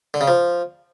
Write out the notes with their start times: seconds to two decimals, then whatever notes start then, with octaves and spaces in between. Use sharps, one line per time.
0.14 D3
0.21 C#3
0.28 F3